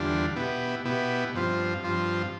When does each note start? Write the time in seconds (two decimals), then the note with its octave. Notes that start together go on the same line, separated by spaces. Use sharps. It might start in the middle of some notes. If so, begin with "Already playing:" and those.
Already playing: E2 D3 G3 D4 F4
0.36 B2 B3 E4 G4
0.85 B2 B3 E4 G4
1.34 G2 F3 C4 F4
1.84 G2 F3 C4 F4